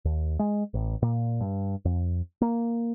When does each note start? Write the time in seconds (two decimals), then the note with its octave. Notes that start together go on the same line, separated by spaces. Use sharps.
0.05 D#2
0.39 G#3
0.74 A1
1.02 A#2
1.41 G2
1.85 F2
2.41 A#3